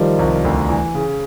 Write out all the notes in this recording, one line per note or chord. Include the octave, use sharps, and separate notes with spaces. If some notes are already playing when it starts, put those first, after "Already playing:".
Already playing: D#3 F3 G3
C2
D2
E3
C#3